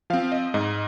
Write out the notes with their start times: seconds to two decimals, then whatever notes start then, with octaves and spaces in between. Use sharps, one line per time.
0.10 F3 C4 F5
0.32 D#5
0.54 G#2 D#5